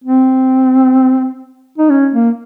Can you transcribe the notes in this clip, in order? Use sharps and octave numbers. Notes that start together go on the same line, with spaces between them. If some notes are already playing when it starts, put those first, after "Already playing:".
C4
D#4
C#4
A#3